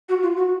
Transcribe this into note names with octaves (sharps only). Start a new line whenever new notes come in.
F#4
F4
F#4